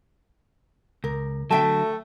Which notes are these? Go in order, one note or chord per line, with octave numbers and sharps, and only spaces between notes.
C#2 A#4
D3 F#3 A3 E5 G5 A5